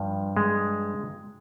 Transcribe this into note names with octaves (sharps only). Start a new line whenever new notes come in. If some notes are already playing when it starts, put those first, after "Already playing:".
Already playing: G2 F3
G#3